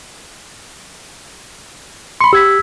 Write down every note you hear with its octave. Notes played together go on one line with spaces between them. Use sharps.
B5 C6 C#7
G4 E6 G#6 B6